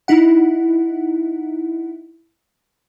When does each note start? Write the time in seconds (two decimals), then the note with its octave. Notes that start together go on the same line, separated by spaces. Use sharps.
0.08 D#4 E4 F#5